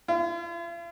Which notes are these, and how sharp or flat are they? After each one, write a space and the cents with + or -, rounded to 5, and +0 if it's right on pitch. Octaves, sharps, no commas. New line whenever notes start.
F4 -45